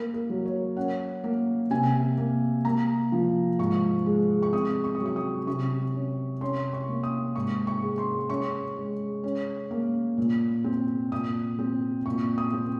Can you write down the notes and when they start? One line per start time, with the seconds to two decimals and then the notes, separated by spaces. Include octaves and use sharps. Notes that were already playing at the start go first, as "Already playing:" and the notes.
Already playing: A#3 A#4
0.14 A#4
0.30 F#3
0.46 C#5
0.76 C#4 F#5
1.24 A#3
1.70 C3 G#5
2.18 A#3
2.65 A#3 A#5
3.12 F3
3.59 G#2 C#6
4.06 G#3
4.42 C#6
4.53 C4 D#6
4.84 C#6
4.95 D#6
5.01 F#3 C#6
5.16 D#6
5.47 C3 C#6
5.94 C#4
6.41 C#4 C6
6.73 C#6
6.89 A#3
7.03 D#6
7.35 G#2 C#6
7.67 C#6
7.82 G#3
7.98 C6
8.30 C#4 C#6
8.76 G#3
9.24 C#4
9.71 A#3
10.18 A#2
10.64 C4
11.12 A#2 D#6
11.59 C4
12.06 A#2 C#6
12.38 D#6
12.53 C4